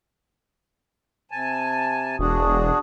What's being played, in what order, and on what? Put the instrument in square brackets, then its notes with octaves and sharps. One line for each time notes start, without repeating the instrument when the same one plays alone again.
[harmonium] C3 G#5 A5
[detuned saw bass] E1 [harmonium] D4 F#4 G#4